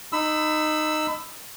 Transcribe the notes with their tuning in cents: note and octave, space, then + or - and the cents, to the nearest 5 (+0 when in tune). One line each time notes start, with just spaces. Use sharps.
D#4 -15 B5 +25 E6 +0